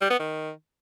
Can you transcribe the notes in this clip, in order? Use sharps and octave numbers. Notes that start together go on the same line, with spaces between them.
G3
B3
D#3